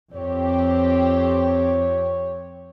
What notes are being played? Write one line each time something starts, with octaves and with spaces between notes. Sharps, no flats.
F2 C4 G4 C#5